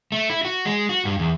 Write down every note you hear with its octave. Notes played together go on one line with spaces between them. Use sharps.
A3
E4
F#4
G#3
F#4
G2
E2